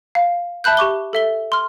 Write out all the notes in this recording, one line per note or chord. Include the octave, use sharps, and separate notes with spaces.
F5
E5 A5 B5 F#6 G6
G4 C#6 D6 G7
A4 E5 G7
C6 F6